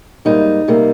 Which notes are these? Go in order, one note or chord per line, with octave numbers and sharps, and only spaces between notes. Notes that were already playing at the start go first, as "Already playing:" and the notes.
G#2 G3 A#3 D#4
C3 G3 A#3